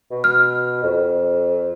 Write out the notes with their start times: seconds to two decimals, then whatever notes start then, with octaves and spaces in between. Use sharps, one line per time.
0.11 B2
0.24 F6
0.83 F2